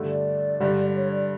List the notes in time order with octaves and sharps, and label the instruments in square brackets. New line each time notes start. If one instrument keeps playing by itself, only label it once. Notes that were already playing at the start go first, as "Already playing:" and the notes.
Already playing: [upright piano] G2 D3 A3
[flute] D5
[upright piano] G2 D3 G3
[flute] C#5
D5